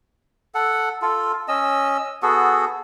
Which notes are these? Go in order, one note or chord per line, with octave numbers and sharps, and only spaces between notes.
A4 F#5
F4 A4
C#4 D#5 E6
B3 F#4 G#4 A4